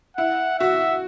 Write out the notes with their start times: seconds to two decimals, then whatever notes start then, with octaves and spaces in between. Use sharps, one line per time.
0.17 E4 F#5
0.59 F#4 E5